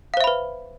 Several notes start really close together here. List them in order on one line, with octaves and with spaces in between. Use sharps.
F5 C5 E5 B5 B4